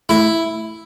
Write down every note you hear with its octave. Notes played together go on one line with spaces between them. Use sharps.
A3 E4